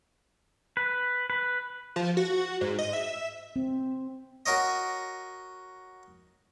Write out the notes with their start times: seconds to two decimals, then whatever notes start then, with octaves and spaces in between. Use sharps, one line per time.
0.77 B4
1.30 B4
1.96 F3
2.17 F#4
2.61 G#2
2.79 D#5
2.93 E5
3.56 C4
4.46 F#4 A#4 C#5 D#5